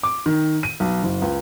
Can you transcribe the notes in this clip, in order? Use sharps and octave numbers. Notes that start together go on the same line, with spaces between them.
D6
D#3
D#7
B1
F#1
C#2